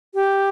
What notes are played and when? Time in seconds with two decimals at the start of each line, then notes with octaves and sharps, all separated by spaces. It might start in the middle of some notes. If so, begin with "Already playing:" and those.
0.14 G4